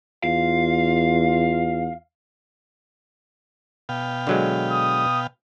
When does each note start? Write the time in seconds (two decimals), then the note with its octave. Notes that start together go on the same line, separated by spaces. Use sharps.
0.24 E2 F4 F5
3.89 B2 F5 G5
4.27 D3 F#3 G#3
4.71 D#6